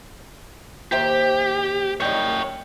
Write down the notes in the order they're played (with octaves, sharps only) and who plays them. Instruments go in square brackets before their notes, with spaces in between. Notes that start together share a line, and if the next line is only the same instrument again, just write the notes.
[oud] D#2 C5 E5 [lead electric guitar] G4
[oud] F#2 G3 D#4 [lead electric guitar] C#5 G5